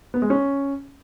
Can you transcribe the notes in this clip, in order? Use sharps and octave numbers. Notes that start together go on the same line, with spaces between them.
B3
G#3
C#4